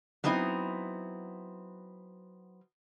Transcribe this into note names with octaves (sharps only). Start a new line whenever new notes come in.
F#3 B3 C4 D#4 E4